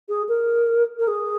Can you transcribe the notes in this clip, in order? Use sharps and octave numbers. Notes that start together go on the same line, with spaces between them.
G#4
A#4
A#4
G#4